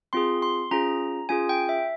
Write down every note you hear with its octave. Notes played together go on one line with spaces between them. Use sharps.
C4 F4 G#4 C6
C6
C#4 F4 G#4 A#5
C#4 F4 G#4 G#5
G5
E5